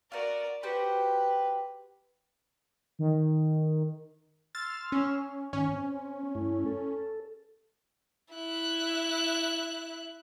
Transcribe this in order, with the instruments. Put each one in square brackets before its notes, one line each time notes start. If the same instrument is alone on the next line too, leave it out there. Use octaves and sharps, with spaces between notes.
[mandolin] F4 F#4 [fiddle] A#4 D5
[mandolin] F#4 G4 C5 [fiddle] B4
[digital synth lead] D#3
[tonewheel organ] C6 E6 F6 [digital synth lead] A6
[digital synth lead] C#4
[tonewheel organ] G#2 D#3 [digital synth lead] C#4
[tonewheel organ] C4
G2 A3 E4
A4
[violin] E4 F#6